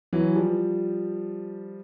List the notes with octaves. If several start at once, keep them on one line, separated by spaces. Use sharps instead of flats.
E3 F#3
F3 G3